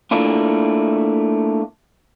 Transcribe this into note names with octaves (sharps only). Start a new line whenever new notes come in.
A3 A#3 D4 E4 F4